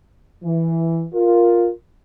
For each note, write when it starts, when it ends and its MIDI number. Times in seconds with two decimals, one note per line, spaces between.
0.43 1.04 52
1.13 1.70 65
1.13 1.70 70